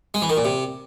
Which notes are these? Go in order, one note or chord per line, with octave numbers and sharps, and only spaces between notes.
G#3
E3
D#3
A#2
C3